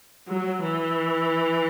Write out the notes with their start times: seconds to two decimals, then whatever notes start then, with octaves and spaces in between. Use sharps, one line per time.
0.28 F#3
0.64 E3